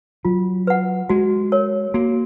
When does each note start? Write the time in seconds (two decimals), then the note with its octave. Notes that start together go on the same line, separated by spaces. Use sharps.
0.25 F#3 F4
0.67 B4 F#5
1.09 G#3 F#4
1.52 A#4 C#5
1.94 A#3 F#4